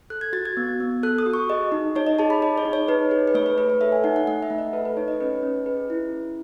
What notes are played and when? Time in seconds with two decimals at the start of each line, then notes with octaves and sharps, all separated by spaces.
0.10 A4 F#6
0.21 G#6
0.33 F#4 A6
0.45 G#6
0.57 B3
0.80 B3
1.03 A4 F#6
1.18 D#6
1.26 F#4
1.34 C#6
1.49 G#4 D#5
1.72 D#4
1.96 D#4 C#5
2.07 D#5
2.19 G#4 A5
2.30 B5
2.42 G#4 D#5
2.58 C#5
2.65 D#4
2.73 C#5
2.88 D#4 B4
3.11 G#4
3.28 B4
3.34 A3 C#5
3.46 B4
3.58 A3 B4
3.70 C#5
3.81 A4 E5
3.92 G#5
4.04 D#4 F#5
4.16 F#5
4.27 A3 F#5
4.43 E5
4.50 A3
4.58 D#5
4.73 A4 B4
4.85 B4
4.97 D#4 C#5
5.08 D#5
5.20 C#4 B4
5.43 C#4
5.66 G#4 B4
5.90 E4
6.12 C#4